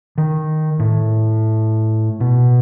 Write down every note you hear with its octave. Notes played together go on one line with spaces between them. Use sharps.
D#3
A2
B2